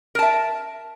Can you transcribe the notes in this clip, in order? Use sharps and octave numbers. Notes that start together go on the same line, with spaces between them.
A#4 E5 A5